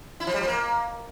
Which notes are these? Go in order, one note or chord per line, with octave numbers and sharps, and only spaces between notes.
E4
F3
G3
F3
A#3